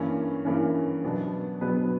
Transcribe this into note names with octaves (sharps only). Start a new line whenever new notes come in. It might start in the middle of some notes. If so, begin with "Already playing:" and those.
Already playing: G2 E3 A#3 C#4
G2 E3 A#3 C#4
B2 F#3 B3 D4
B2 F#3 B3 D4 B4